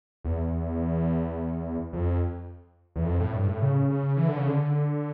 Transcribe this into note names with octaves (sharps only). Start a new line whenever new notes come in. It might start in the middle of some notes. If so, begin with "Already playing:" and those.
E2
F2
E2
F2
A2
G2
A2
C#3
C#3
E3
D3
C#3
D3